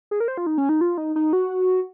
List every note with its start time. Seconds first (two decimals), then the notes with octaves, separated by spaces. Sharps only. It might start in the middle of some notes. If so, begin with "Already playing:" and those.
0.11 G#4
0.20 A#4
0.28 C5
0.37 F4
0.47 D#4
0.58 C#4
0.69 D#4
0.81 F4
0.98 D#4
1.16 D#4
1.33 F#4